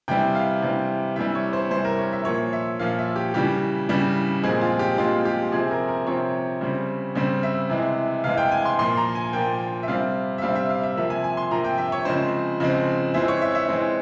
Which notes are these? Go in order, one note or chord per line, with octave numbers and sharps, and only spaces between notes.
C3 E3 G3 G5
F5
C3 E3 G3
C3 E3 G3 E5
C#5
C5
C3 E3 G3 C5
A#4
C#5
E5
A#2 F3 A#3 C#5
E5
A#2 F3 A#3 F5
E5
G4
C#3 E3 G3 G4
C#3 E3 G3
A#2 F3 G#3 C4 G#4
F4
G4
A#2 F3 G#3 C4 F4
G4
C3 F3 C4 G#4
A#4
A#4
C3 F3 C4 C#5
C#3 G3 C4
C#3 G3 C4
E5
C3 E3 G#3
C3 E3 G#3 F5
G5
G#5
C6
A#2 F3 A#3 C6
A#5
G#5
A#2 F3 A#3 G5
E5
C3 G3 C4 F5
E5
C3 G3 C4 F5
E5
F5
E5
C3 F3 A#3 E5
G#5
G#5
C6
C3 F3 A#3 A#5
G5
E5
C#5
C#3 F3 G#3 C4 C5
C#3 F3 G#3 C4
E3 G#3 C4 E5
C#5
E5
E5
E3 G#3 C4